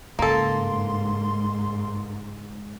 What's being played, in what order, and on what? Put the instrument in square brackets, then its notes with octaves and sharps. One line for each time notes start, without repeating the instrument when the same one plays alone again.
[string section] G#2 [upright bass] C#3 [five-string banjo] A#3 A4 [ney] C6